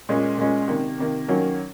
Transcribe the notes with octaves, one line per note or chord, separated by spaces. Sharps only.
A#2 G#3 C#4
A#2 G#3 C#4
C3 D#3 A#3
C3 D#3 A#3
D#3 F#3 A#3 C#4